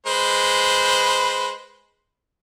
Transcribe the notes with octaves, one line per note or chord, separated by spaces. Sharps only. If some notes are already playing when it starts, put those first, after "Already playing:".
G#3 B4 C5